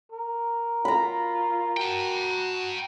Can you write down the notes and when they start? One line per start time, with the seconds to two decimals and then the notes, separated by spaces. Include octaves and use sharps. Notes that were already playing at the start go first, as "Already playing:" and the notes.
0.12 A#4
0.85 F4 A#5 B5
1.77 F#4 G5 A5